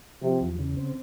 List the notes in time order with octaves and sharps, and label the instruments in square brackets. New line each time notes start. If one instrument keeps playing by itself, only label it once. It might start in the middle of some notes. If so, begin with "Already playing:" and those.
[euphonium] C3 [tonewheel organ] F3
[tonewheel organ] E2
C#3
C4